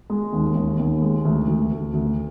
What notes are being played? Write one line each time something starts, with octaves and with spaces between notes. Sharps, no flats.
G#3
D#2
D#2
D#2
G#3
D2
D2
D2
D2